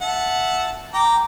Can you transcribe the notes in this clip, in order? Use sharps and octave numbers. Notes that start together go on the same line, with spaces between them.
E5 F#5 A5
G5 A#5 D6